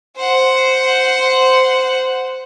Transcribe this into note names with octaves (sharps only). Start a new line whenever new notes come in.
C5 F#5